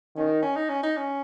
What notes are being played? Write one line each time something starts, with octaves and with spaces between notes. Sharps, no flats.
D#3 C#4
D#4
C#4
D#4
C#4
D#4
C#4